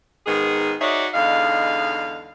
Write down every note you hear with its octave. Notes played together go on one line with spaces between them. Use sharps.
G#2 D#3 G#3 B3 G#4
D#4 F#4 G#4 C#5 D5 E5
E2 D3 G#3 D#4 F5